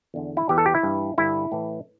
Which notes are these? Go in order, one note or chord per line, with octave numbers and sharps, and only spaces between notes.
E2 D3
E4
E2 E3 G4
A4
G4
E4
G2 E3
G2 D3 E4
A2 E3